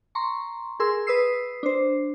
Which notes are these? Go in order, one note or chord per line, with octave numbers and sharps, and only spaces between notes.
A#5 C6 C#6
G#4 A#4 C6 E6
B4 D#6 E6 C7
D4 C5